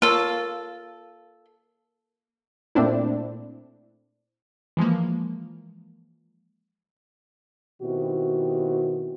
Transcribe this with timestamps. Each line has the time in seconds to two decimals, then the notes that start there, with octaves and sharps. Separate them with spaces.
0.02 A#3 F4 A4 C#5
2.75 A#2 A3 C4 D4 E4
4.77 E3 F3 G#3 A#3
7.82 B2 D#3 C4 E4 F#4 G4